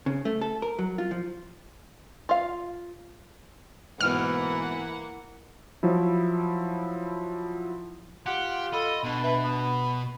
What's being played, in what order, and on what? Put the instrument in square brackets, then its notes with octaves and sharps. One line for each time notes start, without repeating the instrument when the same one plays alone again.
[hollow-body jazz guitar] C#3
A3
A4
A#4
F#3
F4
F3
[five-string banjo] F4 F5
[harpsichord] G#2 B2 [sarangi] E3 [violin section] A#3 F#5 [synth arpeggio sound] F6
[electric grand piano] F3 F#3 E4
[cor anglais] F4 [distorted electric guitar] G4 [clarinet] F#5
[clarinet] A4 [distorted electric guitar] D#5 [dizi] B5
[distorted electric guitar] B2 [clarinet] D4 [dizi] B5
[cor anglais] B4 [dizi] E5
[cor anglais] B3 [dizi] B5